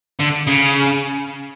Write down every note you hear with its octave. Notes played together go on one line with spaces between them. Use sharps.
D3
C#3